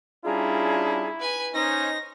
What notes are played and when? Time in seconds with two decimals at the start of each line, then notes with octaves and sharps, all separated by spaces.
0.25 G3 C#4 D4 E4 F4 G#4 A#5
1.20 B4 G#5
1.54 C#4 D#4 C5 A#6